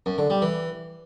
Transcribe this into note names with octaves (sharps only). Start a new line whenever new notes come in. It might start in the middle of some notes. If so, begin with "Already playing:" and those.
F#2
D3
G3
E3